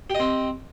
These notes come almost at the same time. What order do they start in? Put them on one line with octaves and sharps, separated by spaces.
G4 D#5 C4